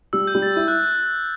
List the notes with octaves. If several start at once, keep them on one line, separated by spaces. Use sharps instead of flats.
G3 E6
G6
G3
A6
E4 G6
F#6